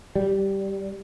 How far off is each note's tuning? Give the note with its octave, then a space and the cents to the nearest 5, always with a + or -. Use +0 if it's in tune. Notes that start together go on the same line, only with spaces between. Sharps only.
G3 -5